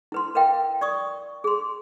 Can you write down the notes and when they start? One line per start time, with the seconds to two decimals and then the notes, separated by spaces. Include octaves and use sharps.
0.12 E4 B4 C6
0.35 A#4 B4 D#5 F5 G5
0.81 D5 C#6 D#6
1.44 G#4 C6